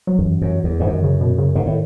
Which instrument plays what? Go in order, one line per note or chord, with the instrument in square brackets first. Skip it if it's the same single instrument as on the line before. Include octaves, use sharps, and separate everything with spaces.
[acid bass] F#3
[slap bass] F#2 [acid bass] E3
[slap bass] F#2
E2
[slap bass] G#2 [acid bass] E3
[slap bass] F#2 [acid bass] D#3
[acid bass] C#3
B2
C#3
[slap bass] G#2 [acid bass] D#3
[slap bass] A2